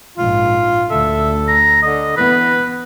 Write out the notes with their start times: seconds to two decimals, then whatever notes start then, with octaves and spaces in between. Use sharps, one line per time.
0.18 A#1 G#2 F4
0.90 D2 A4 E5
1.48 A#5
1.82 D3 D#5
2.17 E3 B3 B4